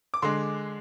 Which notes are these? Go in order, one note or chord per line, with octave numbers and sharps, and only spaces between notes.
D6
D3 G#3 C6